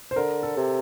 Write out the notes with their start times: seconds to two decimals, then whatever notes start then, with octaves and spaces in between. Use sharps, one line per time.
0.11 C5
0.16 D3 A#4
0.43 A4
0.57 C3